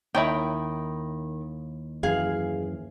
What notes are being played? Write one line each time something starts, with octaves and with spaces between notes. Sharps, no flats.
D#2 D#3 E4 C#5 G5
F#2 E3 G#4 F5